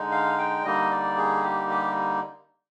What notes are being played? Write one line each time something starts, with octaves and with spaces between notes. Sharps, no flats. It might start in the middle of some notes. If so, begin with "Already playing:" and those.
Already playing: D3 G#3 D#4
F5
G5
D3 G3 A#3 D#4 D#5
D5
G#4
G4
G4